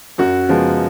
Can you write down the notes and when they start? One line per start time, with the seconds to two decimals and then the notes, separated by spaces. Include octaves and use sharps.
0.18 F#2 F#4
0.49 C#3 F3 G#3 B3